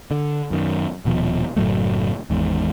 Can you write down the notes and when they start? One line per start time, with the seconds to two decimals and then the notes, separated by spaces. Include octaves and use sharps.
0.11 D3
0.51 F#2 D#3
1.05 D#1 B2 F3
1.56 F#1 A2 F#3 A3
2.30 G#1 E2 G#2